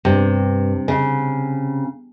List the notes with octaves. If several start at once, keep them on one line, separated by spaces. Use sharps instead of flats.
G2 C3
C#3